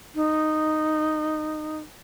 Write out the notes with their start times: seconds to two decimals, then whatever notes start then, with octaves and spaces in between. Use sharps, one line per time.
0.15 D#4